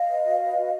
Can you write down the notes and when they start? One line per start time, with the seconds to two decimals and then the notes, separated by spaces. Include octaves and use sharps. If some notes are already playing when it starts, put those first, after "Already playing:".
Already playing: D#5 F5
0.09 B4
0.25 F#4
0.41 B4
0.57 F#4